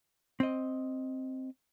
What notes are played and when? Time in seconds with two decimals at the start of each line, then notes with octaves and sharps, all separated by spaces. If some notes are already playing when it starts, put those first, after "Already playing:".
0.40 C4 D#5